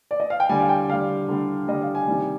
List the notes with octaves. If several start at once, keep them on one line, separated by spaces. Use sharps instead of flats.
D5
D#5
F5
G5
D3 G3 G#5
F5
G5
D3 G3 F5
D3 G3
D3 G3 D#5
F5
G#5
C3 D#3 G3